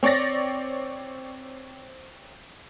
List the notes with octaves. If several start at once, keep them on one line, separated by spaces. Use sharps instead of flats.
C4 C#5 D5 A6 A#6